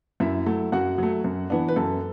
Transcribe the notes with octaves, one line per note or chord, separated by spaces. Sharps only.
F#2 E4 E5
F#3 A3
F#2 F#4 F#5
F#3 A3
F#2
E3 B3 D4
B4
F#2 A4